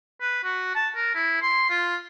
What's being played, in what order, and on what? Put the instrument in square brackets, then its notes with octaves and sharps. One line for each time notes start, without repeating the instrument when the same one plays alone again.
[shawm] B4
F#4
A5
A#4
E4
C6
F4